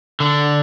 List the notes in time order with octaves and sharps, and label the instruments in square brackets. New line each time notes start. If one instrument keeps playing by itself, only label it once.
[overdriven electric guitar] D3